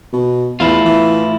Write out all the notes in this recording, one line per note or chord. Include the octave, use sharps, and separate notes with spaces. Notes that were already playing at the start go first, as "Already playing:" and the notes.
B2
E2 A2 E4 F4
E3